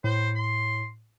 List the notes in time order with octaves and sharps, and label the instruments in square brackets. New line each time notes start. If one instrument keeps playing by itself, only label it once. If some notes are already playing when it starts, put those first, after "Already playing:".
[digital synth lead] A2 [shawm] C5
[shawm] C6